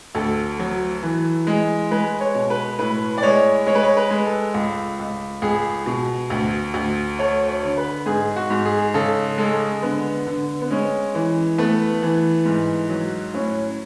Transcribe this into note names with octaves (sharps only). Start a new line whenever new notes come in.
D2 A4
F#3
E3
G#3
G#3 B4
C#5
B2
B4
A2 B4
D5
G#3 C#5
G#3 C#5
B4
C#5
B4
G#3
A4
C#2
C#2
C#2 G#4
B2
D2
D2
A3 C#5
C#5
D3
B4
G#2 G#4
F#4
G#2
G#4
C#3 A4
G#3 A4
D3 B3
D3
B3
G#3 C#4
E3
A3 B3
E3
G#2
F#3
A2 C#4